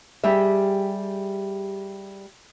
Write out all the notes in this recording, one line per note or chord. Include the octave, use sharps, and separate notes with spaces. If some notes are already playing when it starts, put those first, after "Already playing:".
G3 G4 G#4 E5